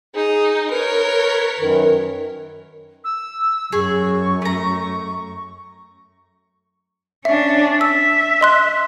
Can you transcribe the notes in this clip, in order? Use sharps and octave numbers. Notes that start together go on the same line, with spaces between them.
D#4 G#4
A#4 B4 C#5
F#2 D#3
E6
F#2 G#4 C#6
A3 A#5
C#4 D4 E5
E5 E6
D#5 C6 F#6